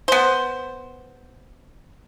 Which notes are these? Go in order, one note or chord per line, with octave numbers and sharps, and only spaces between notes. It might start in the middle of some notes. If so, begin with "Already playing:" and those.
B3 C5